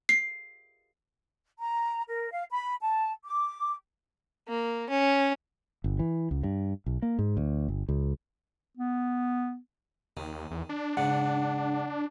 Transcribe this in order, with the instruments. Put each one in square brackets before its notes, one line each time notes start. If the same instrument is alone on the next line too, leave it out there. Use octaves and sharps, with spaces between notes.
[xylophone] C7
[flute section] A#5
A#4
F5
B5
A5
D6
[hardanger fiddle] A#3
C#4
[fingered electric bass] G1
E3
C#2
G2
B1
A#3
G#2
D2
G1
C#2
[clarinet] B3
[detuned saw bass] D#2 [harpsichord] D#3
[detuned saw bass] E2
D4
[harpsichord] G#2 C#3 [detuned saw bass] D4 [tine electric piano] F#5